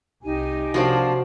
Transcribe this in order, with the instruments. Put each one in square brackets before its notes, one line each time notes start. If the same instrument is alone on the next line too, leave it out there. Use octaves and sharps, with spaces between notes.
[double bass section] C2 [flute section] D#4 G4 G#5
[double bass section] C3 [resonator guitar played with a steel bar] F3 A#3 D4 [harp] F#4 C5